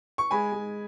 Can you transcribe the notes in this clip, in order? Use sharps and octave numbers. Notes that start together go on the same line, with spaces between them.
C#6
G#3 G#5 B5
G#3